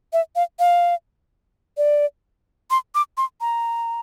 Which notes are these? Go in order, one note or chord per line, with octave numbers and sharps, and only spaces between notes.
E5
F5
F5
D5
C6
D6
C6
A#5